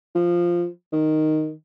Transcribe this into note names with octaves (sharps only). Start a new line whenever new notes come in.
F3
D#3